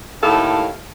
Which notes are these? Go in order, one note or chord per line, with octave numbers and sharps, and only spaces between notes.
D#2 A2 E4 A4 F5